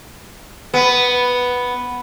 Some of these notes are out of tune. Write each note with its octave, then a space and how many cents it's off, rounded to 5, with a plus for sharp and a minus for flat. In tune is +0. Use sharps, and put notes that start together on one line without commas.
B3 +0